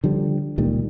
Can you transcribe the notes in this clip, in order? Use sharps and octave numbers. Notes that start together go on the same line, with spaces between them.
D3 F3 G3
C#2 A#2 D#3 G3